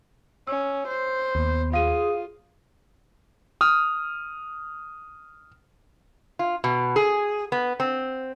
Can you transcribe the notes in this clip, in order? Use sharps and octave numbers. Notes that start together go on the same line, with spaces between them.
C#4 E6
C5
D#2 B3
F4 G#4 F5 D#6 D#7
D#6 F6
F4
B2
G#4
B3
C4